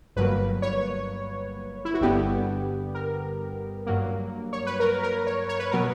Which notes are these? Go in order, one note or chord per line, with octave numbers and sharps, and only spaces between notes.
G1 G2 F#3 A#3 B4
C#5
E4
F#4
G1 G2 D3 G3 B3 G4
A#4
G2 F#3 A#3
C#5
B4
A#4
A#4
C#5
C#5
B4
B2 F#3 B3 A#4